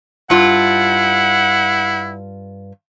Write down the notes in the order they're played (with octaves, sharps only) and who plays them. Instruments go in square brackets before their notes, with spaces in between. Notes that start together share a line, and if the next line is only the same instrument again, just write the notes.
[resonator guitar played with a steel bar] G2 F4 [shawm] E4 [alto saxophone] F#5